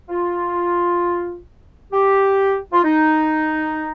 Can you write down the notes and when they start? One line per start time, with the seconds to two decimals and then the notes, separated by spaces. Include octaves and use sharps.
0.10 F4
1.93 G4
2.73 F4
2.84 D#4